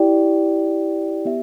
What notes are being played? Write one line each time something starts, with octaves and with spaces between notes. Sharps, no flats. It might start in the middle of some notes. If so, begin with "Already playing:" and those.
Already playing: E4 G4 D5 G5
B3 G4 E5